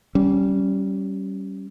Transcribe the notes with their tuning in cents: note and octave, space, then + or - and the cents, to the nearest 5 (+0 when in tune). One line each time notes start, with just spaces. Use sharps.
G3 -20 C#4 +0